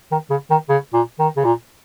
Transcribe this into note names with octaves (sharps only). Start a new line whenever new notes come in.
D#3
C#3
D#3
C#3
A#2
D#3
C#3
A#2